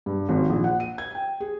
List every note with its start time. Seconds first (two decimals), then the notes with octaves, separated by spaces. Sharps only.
0.06 G2
0.29 G#1
0.50 A#1
0.64 F#5
0.80 D#7
0.98 G#6
1.15 G5
1.40 G#4